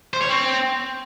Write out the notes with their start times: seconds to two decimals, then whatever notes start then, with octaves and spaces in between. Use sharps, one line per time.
0.13 C5
0.21 C#5
0.29 C4